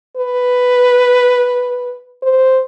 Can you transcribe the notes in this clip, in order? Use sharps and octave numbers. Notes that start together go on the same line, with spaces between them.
B4
C5